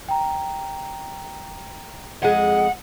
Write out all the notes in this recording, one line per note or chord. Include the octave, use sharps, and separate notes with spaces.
G5 A#5
F2 G#3 F#5